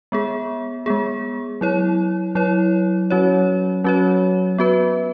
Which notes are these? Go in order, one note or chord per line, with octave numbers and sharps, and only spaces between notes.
G#3 B3 G#4
G#3 B3 G#4
F#3 E4 C#5
F#3 E4 C#5
F#3 C#4 F#4 C#5
F#3 C#4 F#4 C#5
B3 F#4 B4